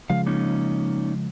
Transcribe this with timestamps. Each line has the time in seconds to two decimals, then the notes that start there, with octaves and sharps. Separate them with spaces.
0.10 C#3 F3 G#3 F5
0.26 A#3 C#4 D#4